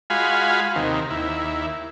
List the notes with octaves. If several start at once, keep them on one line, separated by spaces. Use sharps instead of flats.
G#3 F4 F#4 F5 G#5 B5
D#2 C3 D#3
D#2 E4